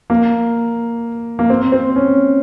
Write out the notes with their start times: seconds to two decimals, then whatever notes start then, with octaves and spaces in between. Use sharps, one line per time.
0.10 A#3
1.39 A#3
1.50 C4
1.72 C4
1.96 C#4